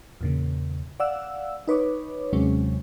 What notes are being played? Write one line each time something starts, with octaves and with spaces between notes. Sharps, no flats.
E2 A#2 C#3
D5 F5 F#5 E6
D#4 B4 C#5 D6
D#2 C3 F#3 G#3 C#4